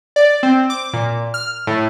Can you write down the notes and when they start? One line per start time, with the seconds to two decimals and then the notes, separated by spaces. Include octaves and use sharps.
0.16 D5
0.43 C4
0.70 D6
0.93 A#2
1.34 F6
1.67 A2